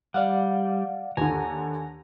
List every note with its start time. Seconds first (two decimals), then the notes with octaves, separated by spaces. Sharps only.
0.14 G3 D5 F5 F#5
1.17 D#2 D3 G#5 A#5